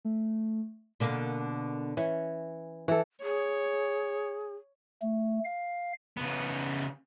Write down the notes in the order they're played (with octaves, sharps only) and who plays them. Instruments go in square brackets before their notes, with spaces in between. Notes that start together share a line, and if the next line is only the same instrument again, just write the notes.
[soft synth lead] A3
[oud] B2 D3 A#3
[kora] E3 [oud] C#4
[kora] E3 A4
[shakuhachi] G#4 [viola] C#5
[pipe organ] A3
F5
[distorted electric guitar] C#3 B3